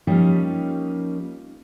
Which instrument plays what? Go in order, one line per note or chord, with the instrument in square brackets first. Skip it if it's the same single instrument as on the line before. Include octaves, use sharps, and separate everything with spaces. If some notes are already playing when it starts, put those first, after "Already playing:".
[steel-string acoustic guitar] F3 G3 A#3 C#4 D#4